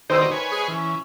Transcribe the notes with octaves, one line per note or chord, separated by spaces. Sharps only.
G2 B2 D#3 D#4 C5 D5 E6
D#3 B4 C#5 G#5
G#3 G#4
E3 C#4